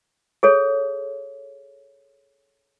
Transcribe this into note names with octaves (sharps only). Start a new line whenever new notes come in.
G#4 A4 C#5